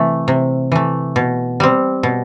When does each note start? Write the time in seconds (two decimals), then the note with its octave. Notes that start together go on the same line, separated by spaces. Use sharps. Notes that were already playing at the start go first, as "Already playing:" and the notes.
Already playing: C3 E3 A3
0.28 C3
0.72 E3 A3
1.16 B2
1.60 G3 C4
2.03 B2